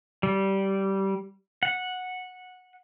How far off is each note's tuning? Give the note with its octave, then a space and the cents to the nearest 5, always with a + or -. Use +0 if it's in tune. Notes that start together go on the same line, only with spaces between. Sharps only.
G3 -15
F#5 -10